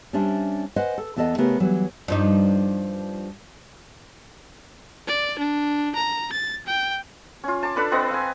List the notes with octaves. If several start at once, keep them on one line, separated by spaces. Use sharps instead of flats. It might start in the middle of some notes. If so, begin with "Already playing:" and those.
G3 C#4 D4 C5 E5
B4 C5 D#5 F#5 G#5
A4
E2 B3 A4 D5 D#5 F5
C#3 A3 B3 G4 A#4
E3 F#3 G3
G2 F3 D#4
D5
D4
A#5
A6
G5
C#4 F4
A5 D6
D4 A4 B4 B5
C4 B4 D#5 F#5
F5 G#5